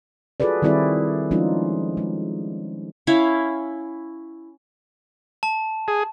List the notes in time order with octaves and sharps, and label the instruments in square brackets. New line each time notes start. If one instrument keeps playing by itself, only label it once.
[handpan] F4 F#4 G#4 A4 B4 D5
D#3 G3 C4 E4 G#4 D5
F3 G#3 C#4 D#4 F4
G#3
[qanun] C#4 E4 F5
[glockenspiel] A5
[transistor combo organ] G#4